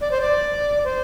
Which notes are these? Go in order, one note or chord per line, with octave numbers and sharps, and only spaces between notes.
D5
C5
D5
C5